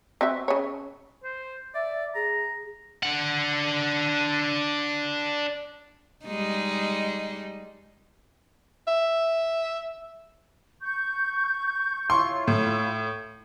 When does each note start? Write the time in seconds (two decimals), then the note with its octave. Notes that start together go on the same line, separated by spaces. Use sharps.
0.21 C4 F#4 E5
0.48 C#3 C#5
1.24 C5
1.75 D5 E5
2.15 G#4 A#5
3.03 D4 F#5
6.25 G3 G#3 D#4
8.87 E5
10.81 C#6 G6
12.10 E4 F4 C#5 C6 C#6
12.48 A2